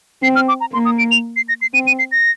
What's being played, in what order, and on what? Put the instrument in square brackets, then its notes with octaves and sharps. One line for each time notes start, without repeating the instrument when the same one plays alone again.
[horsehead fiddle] C4 [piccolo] C7
[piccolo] F6
D6
A#5
[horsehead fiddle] A#3 [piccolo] C6
[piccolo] D#6
D7
F7
C7
A#6
C7
[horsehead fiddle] C4 [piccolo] D#7
[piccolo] D#7
C7
A#6